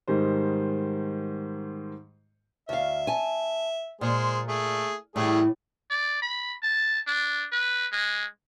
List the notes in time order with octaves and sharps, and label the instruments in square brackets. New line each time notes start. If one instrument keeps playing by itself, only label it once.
[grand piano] G#2 D#3 G3 C5
[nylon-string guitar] D2 F5 [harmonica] E5
[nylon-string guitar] G#5 A5
[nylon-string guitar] A#2 [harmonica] G#3 G#4 C5
[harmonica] A3 G#4
[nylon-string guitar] A2 E3 [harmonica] G3 A3 G#4
[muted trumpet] D5
B5
A5
D4
B4
G#3